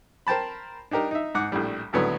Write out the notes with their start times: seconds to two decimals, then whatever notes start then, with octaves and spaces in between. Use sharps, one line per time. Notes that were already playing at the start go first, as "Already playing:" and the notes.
0.27 A#4 C5 G5 A5 B5
0.91 D4 D#4 G4 A#4
1.11 D#4 E5
1.35 G#2 F#5 D6
1.52 A#1 A2 G3
1.93 G#1 D2 A2 F#3 B3